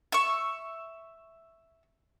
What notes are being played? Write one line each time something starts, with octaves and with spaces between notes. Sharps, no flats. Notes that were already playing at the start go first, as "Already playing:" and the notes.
E5 C#6